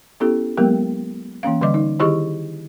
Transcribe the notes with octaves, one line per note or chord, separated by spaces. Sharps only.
B3 C#4 E4 G4 A4
F#3 G#3 A#3 B3 G4 A#4
E3 A#3 C#4 F5
D3 G3 D5 D#5 D6
D#4
D#3 E4 G4 G#4 D#5 C#6